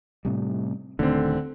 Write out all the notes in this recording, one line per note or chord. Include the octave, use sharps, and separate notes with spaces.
A2 C3 G3
D#1 D3 D#3 A3 C4